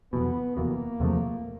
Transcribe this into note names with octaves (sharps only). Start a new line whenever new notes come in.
F1 E2 B2 B3
F1 E2 B2 A#3
E2 C3 F3 A3